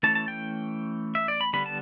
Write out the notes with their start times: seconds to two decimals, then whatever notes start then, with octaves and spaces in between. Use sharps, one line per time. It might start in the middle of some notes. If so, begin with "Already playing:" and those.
0.03 E3 A3 C#4 A5
0.15 A5
0.28 G5
1.15 E5
1.28 D5
1.41 B5
1.53 D3 G3 B3 B5
1.66 A5